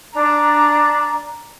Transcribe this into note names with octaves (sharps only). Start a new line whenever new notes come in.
D4 A#5